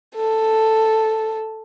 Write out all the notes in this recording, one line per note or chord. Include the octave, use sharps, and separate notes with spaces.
A4